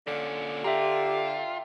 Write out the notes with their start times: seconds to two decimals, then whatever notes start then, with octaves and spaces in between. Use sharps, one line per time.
0.07 A#2 D3 C#4
0.64 F4 G4 E5 G5 A#5